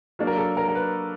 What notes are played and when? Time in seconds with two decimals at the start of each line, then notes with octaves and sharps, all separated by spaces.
0.19 F#3 A#3 D4
0.27 A#4
0.38 A4
0.57 A#4
0.68 A#4
0.75 B4